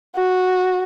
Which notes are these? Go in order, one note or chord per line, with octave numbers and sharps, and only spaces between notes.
F#4